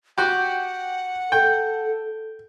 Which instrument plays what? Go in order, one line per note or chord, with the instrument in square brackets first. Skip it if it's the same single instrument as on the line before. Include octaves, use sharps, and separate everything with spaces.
[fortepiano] F#4 G4 [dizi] F#5
[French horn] A4 [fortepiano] G5